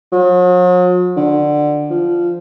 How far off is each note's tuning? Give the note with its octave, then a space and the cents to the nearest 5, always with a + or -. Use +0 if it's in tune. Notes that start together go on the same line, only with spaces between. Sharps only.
F#3 -45
D3 +15
F3 -10